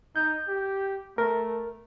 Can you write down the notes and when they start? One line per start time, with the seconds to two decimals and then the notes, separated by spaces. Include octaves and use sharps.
0.16 D#4 G6
0.48 G4
1.18 A3 A#4